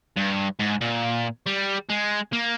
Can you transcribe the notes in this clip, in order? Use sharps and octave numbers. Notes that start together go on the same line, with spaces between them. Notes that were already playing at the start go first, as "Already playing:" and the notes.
G2
G#2
A#2
G3
G#3
A#3